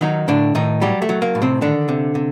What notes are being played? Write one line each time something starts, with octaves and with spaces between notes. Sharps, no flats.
D#3 F#3 D#4
A2 D3 D4
A2 D#3 D#4
F#3 G3 G4
A3
F#3
A#3
A2
C3 C4
D3 D#3 D4
C3
C3